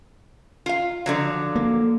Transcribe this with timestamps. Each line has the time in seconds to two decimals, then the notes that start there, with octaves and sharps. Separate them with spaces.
0.66 F4 F5
1.06 D3 F3 F#3
1.56 A#3